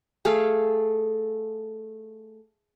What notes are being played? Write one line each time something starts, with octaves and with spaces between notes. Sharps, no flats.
A3 G#4 A4 F5